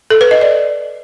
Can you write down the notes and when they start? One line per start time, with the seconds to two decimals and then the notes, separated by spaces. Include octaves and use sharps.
0.10 A4
0.21 B4
0.31 D#5
0.41 D5